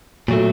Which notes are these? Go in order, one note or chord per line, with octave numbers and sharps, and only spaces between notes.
A#2 F#3 A3